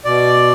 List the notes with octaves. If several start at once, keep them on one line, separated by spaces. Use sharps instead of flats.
B2 D5